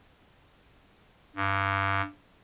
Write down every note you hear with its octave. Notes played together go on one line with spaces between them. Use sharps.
G2